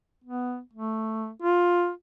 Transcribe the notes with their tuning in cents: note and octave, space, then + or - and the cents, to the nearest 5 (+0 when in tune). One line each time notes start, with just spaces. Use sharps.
B3 +5
A3 +5
F4 +10